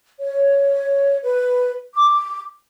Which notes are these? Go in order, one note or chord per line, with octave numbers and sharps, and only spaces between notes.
C#5
B4
D6